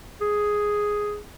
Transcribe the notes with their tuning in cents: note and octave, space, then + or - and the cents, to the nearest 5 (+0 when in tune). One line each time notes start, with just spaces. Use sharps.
G#4 +0